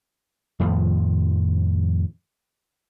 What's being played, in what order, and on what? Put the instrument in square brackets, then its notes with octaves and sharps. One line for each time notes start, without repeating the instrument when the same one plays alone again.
[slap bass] F2 A2 D#3 F3